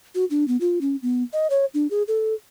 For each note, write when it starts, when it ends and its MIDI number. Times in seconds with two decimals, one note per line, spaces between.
0.15 0.25 66
0.30 0.47 62
0.48 0.57 59
0.61 0.79 65
0.81 0.96 61
1.02 1.23 59
1.33 1.47 75
1.50 1.65 73
1.74 1.87 62
1.90 2.03 68
2.08 2.34 69